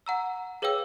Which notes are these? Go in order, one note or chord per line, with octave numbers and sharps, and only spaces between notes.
F#5 A#5 E6
G#4 B4 C#5 F5 G5 E6